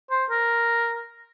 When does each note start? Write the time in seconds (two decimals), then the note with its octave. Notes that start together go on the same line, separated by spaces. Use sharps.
0.11 C5
0.30 A#4